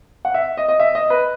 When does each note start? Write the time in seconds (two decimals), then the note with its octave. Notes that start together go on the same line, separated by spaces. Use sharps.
0.25 F#5
0.34 E5
0.57 D#5
0.69 D#5
0.80 E5
0.95 D#5
1.10 B4